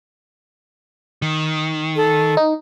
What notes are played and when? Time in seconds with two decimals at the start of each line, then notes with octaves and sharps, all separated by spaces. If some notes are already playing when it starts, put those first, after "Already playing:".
1.22 D#3
1.96 A4
2.37 D#4